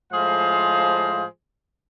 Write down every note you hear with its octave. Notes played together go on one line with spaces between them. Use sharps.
A2 F3 G#3 G#4 C5 F5